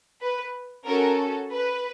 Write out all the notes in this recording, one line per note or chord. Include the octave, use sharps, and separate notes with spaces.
B4
C#4 F#4 A4 A#4
B4